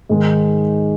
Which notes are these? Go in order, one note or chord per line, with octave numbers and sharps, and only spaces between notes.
G#2 D#3 G#3